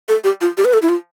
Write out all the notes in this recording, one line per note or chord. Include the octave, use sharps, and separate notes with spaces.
A4
G4
F4
G4
B4
A4
E4
F4